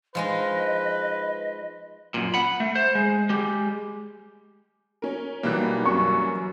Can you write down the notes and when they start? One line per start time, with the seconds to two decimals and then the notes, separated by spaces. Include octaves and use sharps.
0.15 F3 G#3 D#4 B4 D#5
2.14 F#2 A#2
2.34 F#5 B5
2.60 A3
2.75 C5
2.95 G#3
3.30 G#3 G4
5.02 C#4 A#4
5.43 B1 E3 G3 A#3 F#6
5.85 F#2 C#6